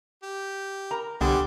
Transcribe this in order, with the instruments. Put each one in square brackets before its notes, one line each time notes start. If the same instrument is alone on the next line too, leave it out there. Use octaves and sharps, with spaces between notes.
[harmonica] G4
[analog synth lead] A#4 [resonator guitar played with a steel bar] A#5
[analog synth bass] C2 [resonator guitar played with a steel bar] D3 B3 [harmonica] G3 C5 G#5 [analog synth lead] G4